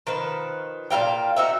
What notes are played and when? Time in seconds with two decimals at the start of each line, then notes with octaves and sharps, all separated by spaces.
0.07 D#3 F3 B4
0.90 A#2 G3 F5 G5
1.36 D#4 F#4 E5